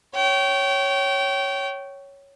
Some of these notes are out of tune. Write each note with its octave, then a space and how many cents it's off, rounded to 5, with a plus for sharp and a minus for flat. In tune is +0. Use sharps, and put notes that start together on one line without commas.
C#5 +0 G5 -25